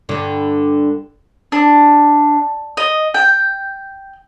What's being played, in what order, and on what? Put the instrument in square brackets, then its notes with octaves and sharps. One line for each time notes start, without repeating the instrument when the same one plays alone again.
[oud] G2 D3
[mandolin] D4
D#5
G5